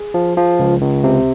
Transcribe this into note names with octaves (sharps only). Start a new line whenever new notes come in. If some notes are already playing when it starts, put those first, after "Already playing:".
Already playing: G#4
F3
F3
C#2
C#2
C3